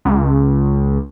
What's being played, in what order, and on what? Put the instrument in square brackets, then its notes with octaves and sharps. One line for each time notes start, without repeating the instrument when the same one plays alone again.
[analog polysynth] C#2